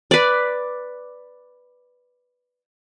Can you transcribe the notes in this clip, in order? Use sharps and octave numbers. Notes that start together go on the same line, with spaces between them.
B4 D5